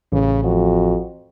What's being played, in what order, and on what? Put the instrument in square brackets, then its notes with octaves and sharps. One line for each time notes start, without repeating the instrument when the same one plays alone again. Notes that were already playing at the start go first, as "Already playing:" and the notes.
[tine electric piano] A1 [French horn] C#3
[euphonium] F2 [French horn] F#4